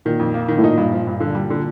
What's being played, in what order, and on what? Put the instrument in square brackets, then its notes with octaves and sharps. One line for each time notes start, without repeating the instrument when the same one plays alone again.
[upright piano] A#2 [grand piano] D#3
[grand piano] F2
A#3
D#3
[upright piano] A2
[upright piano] A#2 [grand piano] D#4
[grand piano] G2
F3
G2
D3
G3
D3